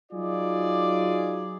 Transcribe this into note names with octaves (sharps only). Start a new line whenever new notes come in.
F#3 D#4 F4 G#4 D5